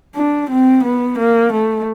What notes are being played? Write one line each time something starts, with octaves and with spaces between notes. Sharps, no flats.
D4
C4
B3
A#3
A3